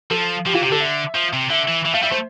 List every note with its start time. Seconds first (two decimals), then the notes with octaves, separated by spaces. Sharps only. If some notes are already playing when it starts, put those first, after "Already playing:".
0.11 F3 A4
0.46 F3 G4
0.54 E3 F4
0.62 C3 G4
0.72 D3 A4
0.80 E5
1.15 F3
1.33 C3
1.50 D3 E5
1.68 E3
1.85 E3 E5
1.94 A3 F5
2.02 G3 E5
2.11 A3 C5